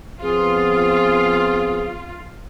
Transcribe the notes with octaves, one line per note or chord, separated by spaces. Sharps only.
F3 B3 C4 F4 G#4